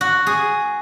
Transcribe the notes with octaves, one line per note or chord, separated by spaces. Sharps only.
F#4
G#4